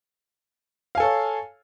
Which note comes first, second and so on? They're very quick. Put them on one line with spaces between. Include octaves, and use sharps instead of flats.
F5 G#5 A4 C#5